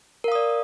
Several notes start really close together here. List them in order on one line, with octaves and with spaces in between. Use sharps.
A#4 F5 D#6 D5